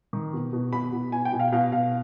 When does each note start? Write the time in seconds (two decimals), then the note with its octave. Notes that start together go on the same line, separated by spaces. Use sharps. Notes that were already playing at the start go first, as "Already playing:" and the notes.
0.13 D#3
0.33 B2
0.53 B2
0.73 B2 B5
0.92 B2
1.12 B2 G#5
1.25 G5
1.33 B2
1.40 F5
1.52 B2 F5
1.72 B2 F5